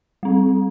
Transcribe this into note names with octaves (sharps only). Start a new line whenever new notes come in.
G3 C4